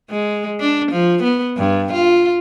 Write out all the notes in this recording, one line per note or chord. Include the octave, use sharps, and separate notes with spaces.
G#3
D4
F3
B3
G2
F4